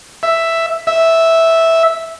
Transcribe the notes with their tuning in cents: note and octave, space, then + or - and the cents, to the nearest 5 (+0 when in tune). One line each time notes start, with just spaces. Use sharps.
E5 +5
E5 -5